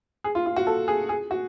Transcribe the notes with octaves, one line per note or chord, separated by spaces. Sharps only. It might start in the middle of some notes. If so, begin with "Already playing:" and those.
G#4
F4
F4
F#4
A4
G#4
G#4
F#4